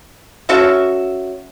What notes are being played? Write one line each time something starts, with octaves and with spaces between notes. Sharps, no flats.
C#4 F#4 A4 E5